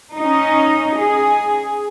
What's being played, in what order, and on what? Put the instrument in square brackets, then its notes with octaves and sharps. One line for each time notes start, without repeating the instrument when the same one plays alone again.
[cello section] C#4 D#4
G#4